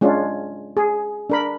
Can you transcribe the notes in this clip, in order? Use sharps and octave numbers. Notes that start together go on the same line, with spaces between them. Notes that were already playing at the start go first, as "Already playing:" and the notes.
G#3 C#4 D4 F4
G#4
D4 A#4 B5